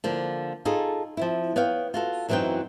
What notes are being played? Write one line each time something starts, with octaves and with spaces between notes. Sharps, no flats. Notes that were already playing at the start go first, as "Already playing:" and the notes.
D3 F3 A#3
D#4 F4 G#4 A4
F3 C4 E4
B3 C#5 F5 G5
F4 F#4 A4
F#2 E3 F#3 C4 D#4 G5